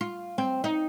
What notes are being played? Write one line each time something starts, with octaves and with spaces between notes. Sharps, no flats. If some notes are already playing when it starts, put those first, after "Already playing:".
F4
C4
D#4